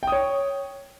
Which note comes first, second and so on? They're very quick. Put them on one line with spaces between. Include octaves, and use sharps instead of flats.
G5 D#6 C#5